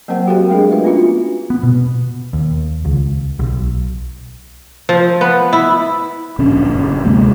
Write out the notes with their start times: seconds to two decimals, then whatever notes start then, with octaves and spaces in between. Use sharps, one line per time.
0.08 F#3 A#3 C4 A#4 C5 F#5
0.28 F#4 G4 A4 A#4 F5 G5
0.49 G#3 A3 D4 G#4 D#5
0.70 F4 B4 E5
0.84 B3 C#4 D4 F4 F#4
0.97 E4
1.50 B3
1.63 B2
2.33 D#2
2.85 C#2
3.39 B1
4.89 F3
5.21 B3
5.53 E4
6.39 D1 A#1 D3 C#4
6.73 F#1
7.05 D2 C3 G#3 A#3